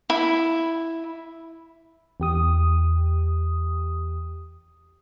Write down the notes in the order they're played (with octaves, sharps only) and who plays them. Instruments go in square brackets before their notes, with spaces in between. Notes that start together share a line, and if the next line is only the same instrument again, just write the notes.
[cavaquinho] E4
[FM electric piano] E2 G4 D#6